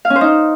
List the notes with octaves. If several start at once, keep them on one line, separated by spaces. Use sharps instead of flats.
F5
C#4
C5
D#4